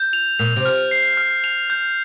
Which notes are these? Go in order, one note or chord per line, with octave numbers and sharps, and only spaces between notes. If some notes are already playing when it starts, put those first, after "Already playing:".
Already playing: G6
F7
A#2 F7
C3
F6
C7
F6
F7
G6